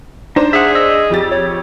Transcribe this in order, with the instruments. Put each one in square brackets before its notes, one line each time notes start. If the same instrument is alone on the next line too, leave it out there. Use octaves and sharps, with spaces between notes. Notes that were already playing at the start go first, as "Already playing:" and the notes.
[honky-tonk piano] D4 C5 [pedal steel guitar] D#4
[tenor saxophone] G#4 [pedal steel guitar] E5 F#5
[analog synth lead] D#5 [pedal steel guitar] E6
[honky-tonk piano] F2 G4 A6
[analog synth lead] C#5